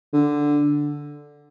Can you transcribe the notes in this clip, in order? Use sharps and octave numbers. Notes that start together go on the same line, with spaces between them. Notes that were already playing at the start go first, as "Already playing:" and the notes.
D3